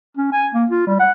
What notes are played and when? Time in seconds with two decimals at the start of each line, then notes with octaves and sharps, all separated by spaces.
0.17 C#4
0.32 G#5
0.54 A#3
0.70 F4
0.87 G3
1.00 F#5